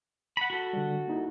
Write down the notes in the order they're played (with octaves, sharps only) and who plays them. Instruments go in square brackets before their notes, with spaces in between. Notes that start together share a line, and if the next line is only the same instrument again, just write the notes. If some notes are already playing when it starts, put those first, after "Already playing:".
[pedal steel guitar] F#5 B5
F#4 A4
[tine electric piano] D3 G3
A#3 D#4 E4